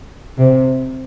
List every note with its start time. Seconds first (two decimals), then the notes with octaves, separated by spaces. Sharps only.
0.38 C3